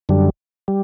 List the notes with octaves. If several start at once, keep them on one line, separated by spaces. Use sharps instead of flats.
F#2 D3 G3
G3